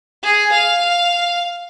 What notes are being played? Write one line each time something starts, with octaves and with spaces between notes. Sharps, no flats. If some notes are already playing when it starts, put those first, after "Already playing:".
G#4
F5